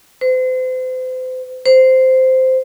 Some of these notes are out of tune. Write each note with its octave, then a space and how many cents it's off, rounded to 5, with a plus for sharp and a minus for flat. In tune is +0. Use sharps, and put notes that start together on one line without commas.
C5 -35
C5 -10